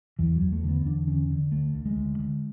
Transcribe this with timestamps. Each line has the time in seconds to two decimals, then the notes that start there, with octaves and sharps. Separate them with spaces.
0.19 E2 E3
0.36 F#3
0.41 E2
0.52 A3
0.64 D3 B3
0.85 E2 D4
1.07 D3 C#4
1.30 D3
1.52 D2 A3
1.74 D2
1.85 G#3
1.96 D2
2.19 D3